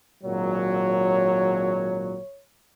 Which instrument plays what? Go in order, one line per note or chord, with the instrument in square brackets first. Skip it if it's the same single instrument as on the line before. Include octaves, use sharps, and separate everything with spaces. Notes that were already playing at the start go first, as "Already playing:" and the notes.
[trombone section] G#1 A#2 F#3 [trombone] C#5